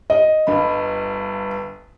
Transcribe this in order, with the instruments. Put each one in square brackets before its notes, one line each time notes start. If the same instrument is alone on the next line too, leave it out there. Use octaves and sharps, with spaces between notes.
[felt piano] D#5
[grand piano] G1 G2 B5